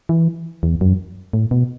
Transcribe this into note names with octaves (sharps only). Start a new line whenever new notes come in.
E3
E2
F#2
A2
B2